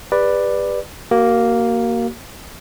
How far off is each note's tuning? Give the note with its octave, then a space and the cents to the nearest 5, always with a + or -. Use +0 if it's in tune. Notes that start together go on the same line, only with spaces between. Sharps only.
G4 +45 B4 +0 D5 +10
A#3 +0 F#4 +40